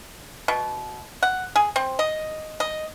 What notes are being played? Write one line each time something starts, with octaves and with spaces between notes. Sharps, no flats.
B2
F#5
G#4
C4
D#5
D#5